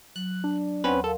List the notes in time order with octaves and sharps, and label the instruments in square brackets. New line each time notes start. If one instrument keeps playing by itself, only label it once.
[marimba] F#3 [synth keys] F#6
[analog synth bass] D4
[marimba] D#2 F#5 C6 [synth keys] C4 C#4 B4
[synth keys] A4 [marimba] A#4 F5